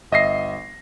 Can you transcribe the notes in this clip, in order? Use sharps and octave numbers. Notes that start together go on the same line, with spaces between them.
G1 D#5 E5 A#6 C7